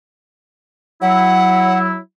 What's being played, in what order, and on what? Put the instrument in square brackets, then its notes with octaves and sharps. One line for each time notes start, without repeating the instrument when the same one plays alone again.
[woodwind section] F#3 E4 [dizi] F#5